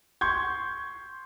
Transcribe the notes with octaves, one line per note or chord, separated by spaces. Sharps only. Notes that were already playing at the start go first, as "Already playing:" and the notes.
C6 C#6 G6 G#6